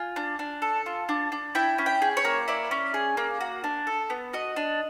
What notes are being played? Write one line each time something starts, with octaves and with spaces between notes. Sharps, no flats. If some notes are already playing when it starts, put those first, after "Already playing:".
Already playing: F4 G#5
D4
D4
A4
F4
D4
D4
E4 G5
C#4
G5
G#4
C#5
A#3
E4 D5
C#4
G#4
A#3
F#4
D4
A4
B3
F#4 D#5
D4